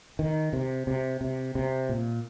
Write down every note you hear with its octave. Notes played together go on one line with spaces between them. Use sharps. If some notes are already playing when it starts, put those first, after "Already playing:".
D#3
C3
C3
C3
C3
A#2